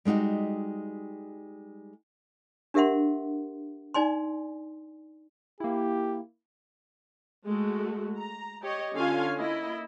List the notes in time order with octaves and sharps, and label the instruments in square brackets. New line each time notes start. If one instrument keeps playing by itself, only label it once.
[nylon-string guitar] G3 G#3 D#4 F#4 G4
[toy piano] D4 G4 A#4 E5 F#5 C6
D#4 D5 G#5 C6
[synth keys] A#3 E4 [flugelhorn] G4
[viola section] G#3 A3 F#4
A#5
G4 C#5 D#5
D3 C#4 F4 F5 G#5
A#3 E4 D#5